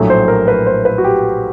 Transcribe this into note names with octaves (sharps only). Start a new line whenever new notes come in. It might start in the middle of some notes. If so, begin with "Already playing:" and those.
Already playing: A#1 A2 F#3 A3
C5
A#4
B4
C5
B4
F#4
G4